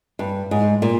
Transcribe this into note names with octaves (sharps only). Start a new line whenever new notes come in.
G2
G#2
A#2